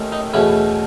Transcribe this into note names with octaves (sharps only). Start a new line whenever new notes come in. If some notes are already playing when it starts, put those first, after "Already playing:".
Already playing: D#2 D#3 A3 C#4
D#4
E2 B2 A3 C#4 E4